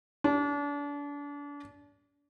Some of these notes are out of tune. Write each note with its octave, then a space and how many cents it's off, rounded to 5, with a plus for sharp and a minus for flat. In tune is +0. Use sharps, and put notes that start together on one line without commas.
D4 -35 G4 +0